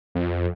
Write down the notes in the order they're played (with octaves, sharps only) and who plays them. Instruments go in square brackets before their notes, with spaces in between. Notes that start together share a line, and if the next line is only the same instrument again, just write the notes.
[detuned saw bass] F2